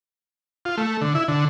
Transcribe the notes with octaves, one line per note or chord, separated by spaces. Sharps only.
F4
A3
D3
E4
D3